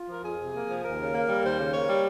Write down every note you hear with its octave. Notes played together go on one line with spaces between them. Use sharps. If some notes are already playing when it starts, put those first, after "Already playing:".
Already playing: F4
F3 A#4
F2 G#4
C3
A#3
F3
D#2 A#4
C#3
A#3
G3
D#2 C5
C#3
A#3 C#5
G3